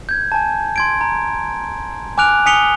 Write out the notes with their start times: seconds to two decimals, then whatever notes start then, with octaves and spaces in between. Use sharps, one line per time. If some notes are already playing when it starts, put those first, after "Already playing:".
0.09 G6 G#6
0.32 G#5 A5
0.76 C6 G#6 D7
1.01 A#5
2.18 G#5 D6 F6 F#6 D7 F7
2.46 G#5 D#6 B6 C#7 F7 G7